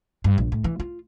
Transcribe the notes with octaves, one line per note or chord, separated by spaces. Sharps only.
G2
A#1
A2
E3
F4